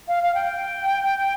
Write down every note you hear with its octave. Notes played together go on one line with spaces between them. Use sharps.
F5
F5
G5